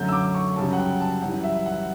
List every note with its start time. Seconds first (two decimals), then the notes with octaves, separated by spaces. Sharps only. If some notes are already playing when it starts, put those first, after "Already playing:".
Already playing: F#2 D3 F#3 A3 G6
0.09 E6
0.12 D6
0.35 C#6
0.56 F#2 C#3 G3 A5
0.73 F#5
0.78 G5
1.00 A5
1.22 F#2 E3 G3 F#5
1.43 E5
1.66 F#5